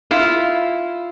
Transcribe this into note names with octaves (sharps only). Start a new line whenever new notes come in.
E4 F4